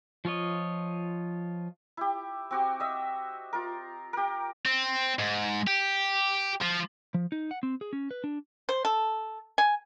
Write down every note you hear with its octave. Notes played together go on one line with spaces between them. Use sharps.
F3 F4 C#5 D#5
E4 G4
C4 F#4 G4
D#5 E5
F4 A#4
G4 A#4
C4
G#2
G4
F3
F3
D#4
F#5
C4
G#4
C#4
B4
D4
C5
A4
G#5